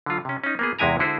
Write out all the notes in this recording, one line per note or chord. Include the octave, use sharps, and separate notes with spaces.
D3 F#3 F4
C3 C#4
C#4 D#4
A#3 B3 G#4
E2 C3 G#3 E4 G#5 A#5
D3 G#3 E4 F#4 G#4 C5